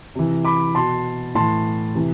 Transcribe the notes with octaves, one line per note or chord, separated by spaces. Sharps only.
C3 E3
B5 D6
B2 A5 C6
A2 E3 A5 C6
C3 E3